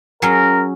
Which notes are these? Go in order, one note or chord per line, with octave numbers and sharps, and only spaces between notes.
F#3 C#4 G#4 A#4